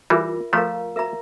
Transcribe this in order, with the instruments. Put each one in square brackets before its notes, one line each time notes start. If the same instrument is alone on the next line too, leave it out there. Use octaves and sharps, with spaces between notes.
[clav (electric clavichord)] E3 G3 [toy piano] F4 A#4 E5
[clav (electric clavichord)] F3 A3 [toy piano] A#4 F5 A#5
[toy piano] A#4 E5 A#5